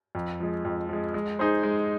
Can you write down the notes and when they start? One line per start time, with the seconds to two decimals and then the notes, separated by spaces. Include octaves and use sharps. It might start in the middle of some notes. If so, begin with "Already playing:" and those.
0.15 F2
0.40 F3 G#3
0.65 F2
0.89 F3 G#3
1.14 G#3
1.39 D#4 G#4 C5
1.63 G#3